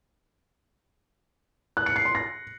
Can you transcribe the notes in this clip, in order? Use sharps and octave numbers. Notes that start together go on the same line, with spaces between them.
F#6
C#7
C7
C6
A#6